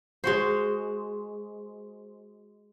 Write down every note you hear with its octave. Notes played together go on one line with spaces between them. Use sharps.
G#3 F#4 C5